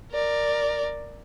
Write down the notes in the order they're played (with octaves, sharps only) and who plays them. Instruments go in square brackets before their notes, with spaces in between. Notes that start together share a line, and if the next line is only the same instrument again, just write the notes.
[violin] A#4 D5